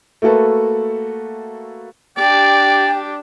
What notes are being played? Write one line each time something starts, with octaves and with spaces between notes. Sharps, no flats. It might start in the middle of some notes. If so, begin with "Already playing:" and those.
A3 A#3 F#4 A4 B4
D4 G4 D5 G5